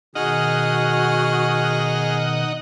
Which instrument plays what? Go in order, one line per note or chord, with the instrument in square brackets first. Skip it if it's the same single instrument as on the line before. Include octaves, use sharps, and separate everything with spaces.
[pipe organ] B2 D#3 [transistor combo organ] D#4 D#5 F#5 [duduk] F#4 [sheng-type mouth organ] G#4 F6